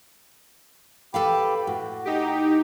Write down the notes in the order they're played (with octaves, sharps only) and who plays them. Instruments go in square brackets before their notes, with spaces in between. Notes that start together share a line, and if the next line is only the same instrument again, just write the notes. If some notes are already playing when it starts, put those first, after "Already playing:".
[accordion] G4 G5 B5 [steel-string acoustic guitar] A4 B4 F5
[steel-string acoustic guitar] A2 [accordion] F#4
[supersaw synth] D#4 G4